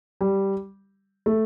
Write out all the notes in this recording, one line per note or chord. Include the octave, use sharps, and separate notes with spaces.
G3
A3